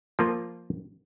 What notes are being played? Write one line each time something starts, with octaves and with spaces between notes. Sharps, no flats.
F3 A#3 F4